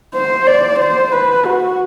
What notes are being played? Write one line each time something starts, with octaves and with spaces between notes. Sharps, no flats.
C5
D5
C5
B4
F#4